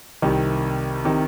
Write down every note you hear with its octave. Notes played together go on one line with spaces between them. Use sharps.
C2 C3 D#3
C3 D#3